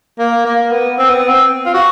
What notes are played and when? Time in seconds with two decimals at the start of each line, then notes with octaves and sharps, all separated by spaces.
0.19 A#3
0.45 A#3
0.71 B3
0.99 C4
1.09 B3
1.28 C4
1.66 F4
1.74 F#4